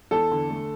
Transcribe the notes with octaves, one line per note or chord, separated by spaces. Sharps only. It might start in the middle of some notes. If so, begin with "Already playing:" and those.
E2 A4
D3
A3